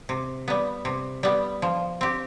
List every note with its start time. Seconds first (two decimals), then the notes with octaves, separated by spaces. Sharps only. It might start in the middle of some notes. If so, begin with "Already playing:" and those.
0.09 C3
0.48 G3 B3
0.85 C3
1.23 G3 B3
1.62 F3
2.01 C4 G4